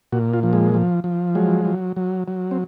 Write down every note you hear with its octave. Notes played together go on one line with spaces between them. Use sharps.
A#2 F#4
F4
F3
G#3
F3
F3
F#3 G#3
F#3
F#3
F#3
C4